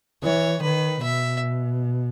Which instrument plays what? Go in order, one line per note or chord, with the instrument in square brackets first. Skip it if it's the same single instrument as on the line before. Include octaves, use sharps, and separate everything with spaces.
[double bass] E3 [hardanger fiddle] C#5
[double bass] D#3 [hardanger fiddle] B4
[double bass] B2 [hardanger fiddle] E5